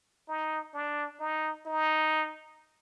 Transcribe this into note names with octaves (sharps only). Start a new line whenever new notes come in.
D#4
D4
D#4
D#4